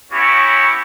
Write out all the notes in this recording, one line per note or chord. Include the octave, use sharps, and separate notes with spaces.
B3 C#4 E4 F#4 G4 C#5